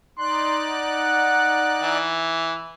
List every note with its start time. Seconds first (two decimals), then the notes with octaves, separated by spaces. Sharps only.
0.19 D#4 D5 C6 F#6
0.67 F#5
1.82 E3